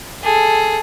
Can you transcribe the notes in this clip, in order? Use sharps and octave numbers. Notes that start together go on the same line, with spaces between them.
G#4 A4